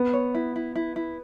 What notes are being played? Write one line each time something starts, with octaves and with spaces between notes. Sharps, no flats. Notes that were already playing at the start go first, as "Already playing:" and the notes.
Already playing: B3
C#5
E4
E4
E4
E4